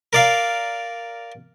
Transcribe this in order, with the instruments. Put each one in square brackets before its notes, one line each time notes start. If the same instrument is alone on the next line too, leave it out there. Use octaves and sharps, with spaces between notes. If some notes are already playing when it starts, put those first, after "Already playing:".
[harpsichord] A#4 D5 F5